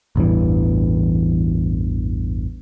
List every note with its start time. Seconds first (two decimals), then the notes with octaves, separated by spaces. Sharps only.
0.16 A1 E2 G2 E3